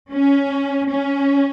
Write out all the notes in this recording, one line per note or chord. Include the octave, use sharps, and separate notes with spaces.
C#4
C#4